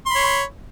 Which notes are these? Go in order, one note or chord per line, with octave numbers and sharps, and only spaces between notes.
C#5 B5 C6